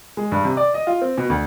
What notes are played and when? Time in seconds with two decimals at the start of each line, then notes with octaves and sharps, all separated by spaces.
0.17 G#3
0.32 G2
0.44 C3
0.57 D5
0.74 D#5
0.87 F4
1.01 C4
1.18 B2
1.30 D2